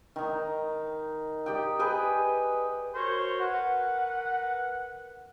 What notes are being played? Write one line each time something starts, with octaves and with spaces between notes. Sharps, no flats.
D#3 D#4
G4 D5 D#5 G5
G#4 B4 D#5 G5
F#4 A#4 C5 C#5
A#4 B4 F#5